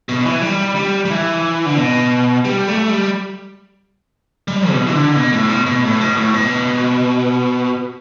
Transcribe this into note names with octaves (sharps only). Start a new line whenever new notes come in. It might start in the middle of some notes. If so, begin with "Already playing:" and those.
B2
E3
G3
G3
G3
E3
D3
B2
G3
A3
G3
G3
B2
E3
D3
B2
A2
B2
B2
A2
B2
A2
B2